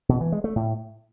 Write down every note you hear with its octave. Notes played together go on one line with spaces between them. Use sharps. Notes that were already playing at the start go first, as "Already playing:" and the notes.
B2
E3
G#3
A3
A2